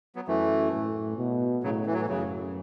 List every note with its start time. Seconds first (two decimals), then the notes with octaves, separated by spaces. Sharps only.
0.16 F#3 B3
0.27 F#2 E3 A3
0.73 A2
1.18 B2
1.63 A2 C#3 F#3
1.86 E3
1.94 F#3
2.01 E3
2.09 F#2 C#3